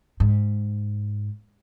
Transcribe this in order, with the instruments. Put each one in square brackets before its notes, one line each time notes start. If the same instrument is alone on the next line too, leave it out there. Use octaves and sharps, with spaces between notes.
[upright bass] G#2